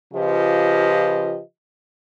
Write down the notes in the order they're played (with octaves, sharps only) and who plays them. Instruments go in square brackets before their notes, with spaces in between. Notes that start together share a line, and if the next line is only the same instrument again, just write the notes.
[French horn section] C#3 F3 F4 G4 B4 D#5